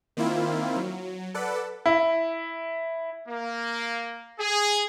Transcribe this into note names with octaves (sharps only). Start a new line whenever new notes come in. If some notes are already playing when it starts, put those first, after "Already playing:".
D#3 A#3 C4 E4 F4
F#3
A4 B4 D5 F#5
E4
A#3
G#4